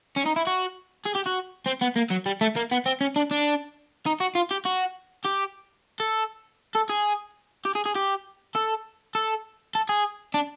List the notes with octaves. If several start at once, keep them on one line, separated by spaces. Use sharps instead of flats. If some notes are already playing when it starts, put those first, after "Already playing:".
C#4
D#4
E4
F#4
G#4
G4
F#4
C4
B3
A#3
F#3
G3
A3
A#3
B3
C4
C#4
D4
D4
D#4
F#4
F4
G4
F#4
G4
A4
A4
G#4
G4
G#4
G#4
G4
A4
A4
A4
G#4
D4